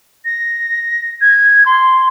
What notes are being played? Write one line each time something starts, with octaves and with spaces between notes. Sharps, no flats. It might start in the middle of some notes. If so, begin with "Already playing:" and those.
A#6
G#6
C6